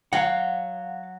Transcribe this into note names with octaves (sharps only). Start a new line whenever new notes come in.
F#3 F5 F#5